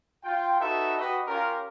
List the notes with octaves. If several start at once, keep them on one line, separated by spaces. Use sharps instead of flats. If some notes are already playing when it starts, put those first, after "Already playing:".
F4 G5
D#4 F#4 A4 B4 E5
F#4 G4 B4 D#5
C#4 F4 G4 A#4